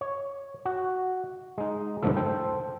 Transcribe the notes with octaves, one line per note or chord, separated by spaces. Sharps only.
C#5
F#4
G#3 D#4
D2 G2 A#2 F3 A3 E4
A4 C5 G5 A5